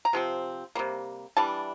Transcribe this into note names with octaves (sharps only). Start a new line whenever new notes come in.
A#5
C3 F3 C4
C3 G3 A#3
E3 G3 D4 A5